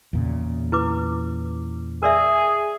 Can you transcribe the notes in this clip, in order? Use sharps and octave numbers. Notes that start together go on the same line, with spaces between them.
E2 A#2 C#3
E4 B4 D6
G#4 A#4 D5 E5